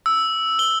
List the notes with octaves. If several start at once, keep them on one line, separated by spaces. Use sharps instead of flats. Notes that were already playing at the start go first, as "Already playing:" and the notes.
E6
G7